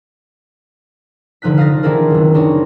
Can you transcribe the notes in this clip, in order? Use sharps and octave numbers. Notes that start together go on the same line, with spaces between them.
F1 D3 F3 D#4 F#6 B6
F5 D#6 A6 A#6
D#3 C4 D4 E4 G#4 A#4
F#1 C#2
C4 D4 D#4 C#5 D#5